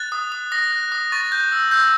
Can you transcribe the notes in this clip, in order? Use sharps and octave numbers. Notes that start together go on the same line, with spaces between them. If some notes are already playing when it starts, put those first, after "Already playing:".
Already playing: F#6 A6
D#6
D#6
D#6 A#6
F#6
D#6
C#6 A6
G6
E6
E6 G6